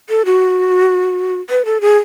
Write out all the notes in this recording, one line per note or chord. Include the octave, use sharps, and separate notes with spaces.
A4
F#4
B4
A4
G#4